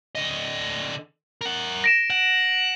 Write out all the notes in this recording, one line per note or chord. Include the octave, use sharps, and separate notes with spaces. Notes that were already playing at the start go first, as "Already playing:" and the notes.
D3 D#5
A#4 F#5
A#6 D7 E7
F#5